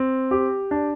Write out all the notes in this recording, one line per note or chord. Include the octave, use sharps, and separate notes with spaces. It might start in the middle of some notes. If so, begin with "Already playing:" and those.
Already playing: C4
G4
D4